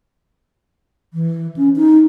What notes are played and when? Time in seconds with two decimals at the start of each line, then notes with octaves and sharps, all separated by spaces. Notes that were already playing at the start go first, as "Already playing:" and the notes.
1.14 E3
1.56 C#4
1.76 D#4